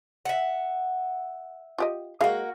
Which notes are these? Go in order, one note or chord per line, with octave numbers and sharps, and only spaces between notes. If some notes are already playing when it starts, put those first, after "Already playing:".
E5 F#5
F4 G4 D#5
G#3 A#3 F#4 D#5 F5